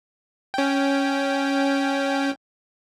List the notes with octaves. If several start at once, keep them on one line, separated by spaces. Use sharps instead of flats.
C#4 G5